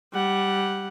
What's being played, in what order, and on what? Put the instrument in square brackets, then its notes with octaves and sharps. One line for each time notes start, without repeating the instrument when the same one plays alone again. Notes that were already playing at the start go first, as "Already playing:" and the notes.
[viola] G3 F#5